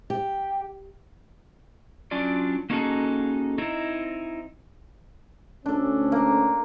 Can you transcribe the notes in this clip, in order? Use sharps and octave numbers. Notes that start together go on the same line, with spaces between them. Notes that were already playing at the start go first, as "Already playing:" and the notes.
G4
F#3 C#4 D4 F4 D5
A#3 C#4 D#4 F#4 G#4 A4
C4 D#4 E4
D2 C#4 D4 A4
A#3